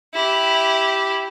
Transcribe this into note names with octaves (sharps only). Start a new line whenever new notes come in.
E4 G4